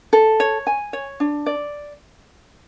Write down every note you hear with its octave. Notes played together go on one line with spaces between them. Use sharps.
A4
C#5
G#5
C#5
D4
D5